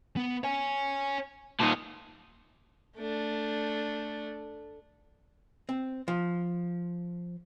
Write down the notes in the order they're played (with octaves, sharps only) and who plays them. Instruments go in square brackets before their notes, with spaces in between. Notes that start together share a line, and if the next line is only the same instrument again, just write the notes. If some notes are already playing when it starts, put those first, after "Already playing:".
[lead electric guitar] B3
C#5 G#5
[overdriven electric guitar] A#2 D#4 [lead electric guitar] A#4 A5
[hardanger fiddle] A3 D4
[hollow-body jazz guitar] C4
F3